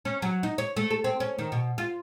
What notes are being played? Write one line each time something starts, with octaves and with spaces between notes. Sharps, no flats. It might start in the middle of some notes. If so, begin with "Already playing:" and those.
C#4
F#3
D#4
C#5
A3
A4
C4
C#4
D#3
B2
F4